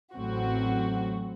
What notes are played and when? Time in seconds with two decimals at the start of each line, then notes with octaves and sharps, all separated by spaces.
0.14 A1 A2 F#3 C4 F#4